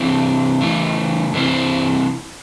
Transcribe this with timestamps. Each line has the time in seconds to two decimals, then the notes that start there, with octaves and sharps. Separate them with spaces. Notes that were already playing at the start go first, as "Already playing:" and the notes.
Already playing: C3 E3 C4
0.61 C#3 E3 A3
1.34 C3 E3 C4 E4 C5